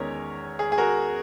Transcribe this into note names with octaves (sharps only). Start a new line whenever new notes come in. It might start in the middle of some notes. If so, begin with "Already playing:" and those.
Already playing: E2 D#3 G#3 C#4 A#4 C#5
G#4
G#4
F#4 A#4